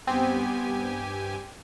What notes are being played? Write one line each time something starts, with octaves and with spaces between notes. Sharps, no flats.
G2 B3 C4 G4 G#5